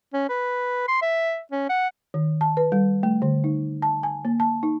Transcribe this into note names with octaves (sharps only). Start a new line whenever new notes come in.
C#4
B4
C6
E5
C#4
F#5
D#3
A5
B4
G3
A3
D3
D#4
A5
G#5
A#3
A5
D#4